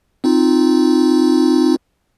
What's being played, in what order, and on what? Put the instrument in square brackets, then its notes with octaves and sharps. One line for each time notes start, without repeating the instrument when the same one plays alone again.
[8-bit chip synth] C4 D#4 F4